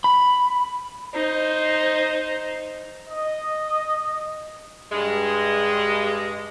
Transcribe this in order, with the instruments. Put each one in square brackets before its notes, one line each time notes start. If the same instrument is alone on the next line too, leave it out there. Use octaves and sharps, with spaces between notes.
[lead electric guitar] B5
[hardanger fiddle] D#4 C5
[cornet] D#5
[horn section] G2 G#3